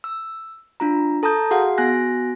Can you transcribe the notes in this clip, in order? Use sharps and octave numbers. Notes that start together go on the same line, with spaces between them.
E6
D4 F4 A#5
A4 A5 A#5 D#6 G6
F#4 G#4 F5 F#5
B3 F#4 G#5 F#6 A#6